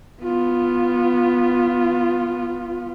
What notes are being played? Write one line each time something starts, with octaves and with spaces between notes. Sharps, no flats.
B3 F4